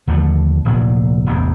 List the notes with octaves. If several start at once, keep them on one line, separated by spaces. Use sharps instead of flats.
D#2 D3 F3 A3
F1 D2 A#2 F#3
E1 A1 E2 C3